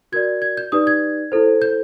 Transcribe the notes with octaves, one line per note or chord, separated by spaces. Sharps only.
F#4 A#4 D5 G#6
G#6
G6
D#4 G4 B4 D5 D#6
G#6
E4 A4 C5
G6